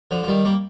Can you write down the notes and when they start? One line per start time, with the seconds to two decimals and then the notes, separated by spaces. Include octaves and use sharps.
0.11 D3 F3
0.23 F3
0.28 D#3 G3
0.45 G3 A#3